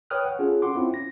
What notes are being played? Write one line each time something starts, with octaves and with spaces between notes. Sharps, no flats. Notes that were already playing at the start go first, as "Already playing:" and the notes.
B4 C#5 G5 D#6 F6 F#6
F#5
C#4 F4 G#4 A4
F#4 F#5 C6 D6
C4 C#4 E4 F4
A#6